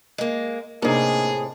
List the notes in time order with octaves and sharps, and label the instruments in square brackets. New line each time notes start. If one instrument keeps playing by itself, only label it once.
[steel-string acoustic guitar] G#3 A#3
[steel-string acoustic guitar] A2 C3 [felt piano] A#3 D4 D#4 [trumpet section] G#4